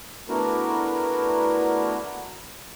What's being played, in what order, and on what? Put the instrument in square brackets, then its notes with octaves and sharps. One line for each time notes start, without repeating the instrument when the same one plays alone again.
[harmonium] A3 B3 D4 E4 F#4 A#4